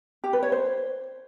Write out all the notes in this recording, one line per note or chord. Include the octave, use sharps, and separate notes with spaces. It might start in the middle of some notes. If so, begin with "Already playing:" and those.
G4
B4
C#5
C5